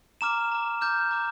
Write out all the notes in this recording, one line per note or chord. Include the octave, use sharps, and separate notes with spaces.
A#5 D6 F6 E7
A#5 D6 F6
A#5 D6 F6 G6
A#5 D6 F6